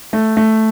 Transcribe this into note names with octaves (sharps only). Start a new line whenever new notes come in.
A3
A3